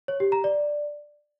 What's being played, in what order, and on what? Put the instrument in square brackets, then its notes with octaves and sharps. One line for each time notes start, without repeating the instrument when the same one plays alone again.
[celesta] C#5
G4
A#5
D5